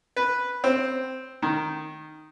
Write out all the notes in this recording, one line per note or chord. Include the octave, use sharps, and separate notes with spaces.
B4
C4
D#3